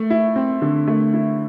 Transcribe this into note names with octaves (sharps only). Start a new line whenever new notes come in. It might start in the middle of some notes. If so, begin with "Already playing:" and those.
Already playing: A3
E4
C4
D3
A3
E4